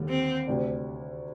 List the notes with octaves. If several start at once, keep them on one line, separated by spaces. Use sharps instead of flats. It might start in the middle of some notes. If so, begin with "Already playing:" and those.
Already playing: D#2 D3 G3 A#3
C4
D2 C3 G3 D4 G4